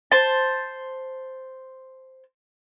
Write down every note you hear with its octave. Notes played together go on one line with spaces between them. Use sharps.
C5 A5